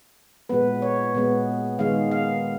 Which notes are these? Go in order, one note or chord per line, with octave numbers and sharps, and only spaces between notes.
A#2 G#3 B3 B4
C#5
A#2 G#3 B3
D#3 G#3 B3 F5
F5